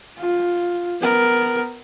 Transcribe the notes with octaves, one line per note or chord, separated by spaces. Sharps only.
F4
B3 A#4